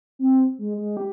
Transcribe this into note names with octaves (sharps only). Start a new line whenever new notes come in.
C4
G#3
G#3
G4